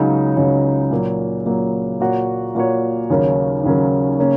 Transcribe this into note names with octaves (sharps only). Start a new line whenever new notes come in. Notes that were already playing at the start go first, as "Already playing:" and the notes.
Already playing: C#2 C#3 F#3 D#4
C#2 C#3 F#3 D#4
A#2 F#3 A#3
A#2 F#3 A#3
A#2 A#3 F#4 C#5
A#2 A#3 F#4 C#5
D#2 C#3 F#3 C#4 A#4
D#2 C#3 F#3 C#4 A#4
C#3 A#3 C#4